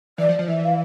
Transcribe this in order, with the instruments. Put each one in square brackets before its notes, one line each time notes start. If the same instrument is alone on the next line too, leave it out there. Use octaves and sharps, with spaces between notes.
[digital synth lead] E3 [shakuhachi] D5
[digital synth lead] F3
F3
[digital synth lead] E3 [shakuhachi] E5
[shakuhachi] F5